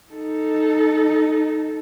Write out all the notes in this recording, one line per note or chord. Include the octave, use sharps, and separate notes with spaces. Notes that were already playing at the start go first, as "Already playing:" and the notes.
D#4 A4